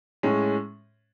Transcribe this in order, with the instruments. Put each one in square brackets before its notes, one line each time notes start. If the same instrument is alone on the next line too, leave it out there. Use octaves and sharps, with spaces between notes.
[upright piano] A2 G#3 C#4